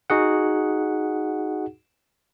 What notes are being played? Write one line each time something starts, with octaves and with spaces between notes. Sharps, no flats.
D#4 F#4 G#4 F#5